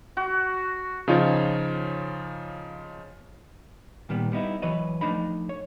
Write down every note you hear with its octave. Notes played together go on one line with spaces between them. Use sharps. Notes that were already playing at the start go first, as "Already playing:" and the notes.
F#4
C#3 F3 D#4 F4 C#5
A#2 D#3 G3 B3
G3 B3 D#4 E4
E3 F#3 B4 C#5 D#5
F3 A3 D4 D#4 B5
C#5